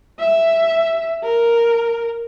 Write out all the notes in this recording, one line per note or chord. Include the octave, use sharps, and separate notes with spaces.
E5
A#4